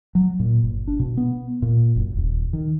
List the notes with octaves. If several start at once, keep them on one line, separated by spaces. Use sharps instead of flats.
F#3
A#2
G1
D4
B2
B3
A#2
F#1
D#1
D#3